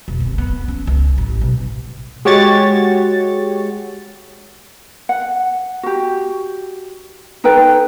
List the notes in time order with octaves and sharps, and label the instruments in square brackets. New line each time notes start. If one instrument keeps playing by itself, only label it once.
[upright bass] E1
C3
B3
C#4
C#2
A1
B1
[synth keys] G#3 F#4 G4 C#5 C#6 A6
[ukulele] F#5
F#4 G4
D#4 A4 B4 G5